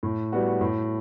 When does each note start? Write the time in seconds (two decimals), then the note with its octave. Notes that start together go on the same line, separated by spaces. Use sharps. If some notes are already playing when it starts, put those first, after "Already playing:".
0.03 A2
0.32 G3 B3 F#4
0.61 A2